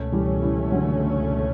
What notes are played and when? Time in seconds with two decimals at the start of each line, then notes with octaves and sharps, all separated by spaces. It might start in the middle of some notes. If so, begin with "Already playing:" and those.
Already playing: C#2 B2 A3 C#4
0.12 E3 G3
0.42 E3 G3
0.72 D3 F#3